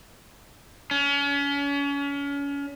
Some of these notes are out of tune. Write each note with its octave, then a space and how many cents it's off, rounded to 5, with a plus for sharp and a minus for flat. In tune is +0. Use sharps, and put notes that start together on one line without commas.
C#4 +35